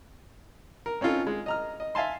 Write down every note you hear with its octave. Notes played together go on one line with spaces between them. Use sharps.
A#4
C4 C#4 D#4 F4 A4
G#3
D#5 A#5 F6
D#5
E5 F5 G#5 A5 C6